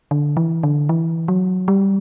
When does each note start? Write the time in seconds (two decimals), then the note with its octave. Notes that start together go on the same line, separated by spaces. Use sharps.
0.11 D3
0.37 E3
0.63 D3
0.89 E3
1.28 F#3
1.68 G3